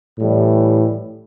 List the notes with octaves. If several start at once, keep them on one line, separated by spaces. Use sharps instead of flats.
A2 E3 G3